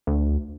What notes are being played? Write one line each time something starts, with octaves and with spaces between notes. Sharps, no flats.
D2